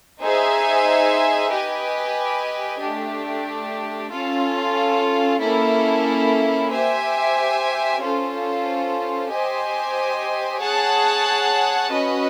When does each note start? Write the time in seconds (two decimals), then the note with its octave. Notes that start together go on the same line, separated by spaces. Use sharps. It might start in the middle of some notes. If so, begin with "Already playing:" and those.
0.22 D#4 G#4 C5 E5 G#5
1.53 G4 B4 D#5 G#5
2.82 A3 D4 G4
4.13 C#4 F4 A4
5.42 A#3 C#4 E4 A4
6.72 G4 C5 E5 G#5
8.01 C#4 F4 A4 C5
9.32 G4 C5 D#5 G#5
10.61 G#4 C#5 F#5 A5
11.90 C#4 F#4 B4 D#5